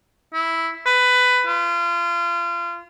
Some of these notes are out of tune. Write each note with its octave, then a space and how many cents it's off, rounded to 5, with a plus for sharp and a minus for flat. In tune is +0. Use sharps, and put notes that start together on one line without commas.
E4 -5
B4 +15
F4 -30